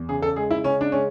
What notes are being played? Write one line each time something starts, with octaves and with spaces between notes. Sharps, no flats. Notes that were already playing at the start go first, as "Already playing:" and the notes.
Already playing: E2
C#3 G#4
A4
G#3 G#4
E4
C#3 C#4
D4
G#3 C#4